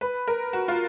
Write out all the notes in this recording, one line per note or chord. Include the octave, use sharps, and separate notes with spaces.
B4
A#4
F#4
F4